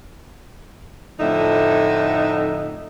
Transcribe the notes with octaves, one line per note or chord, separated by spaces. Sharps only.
F2 A2 D3 D#4 E5